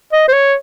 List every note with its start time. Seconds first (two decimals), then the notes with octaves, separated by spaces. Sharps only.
0.13 D#5
0.28 C5
0.33 C#5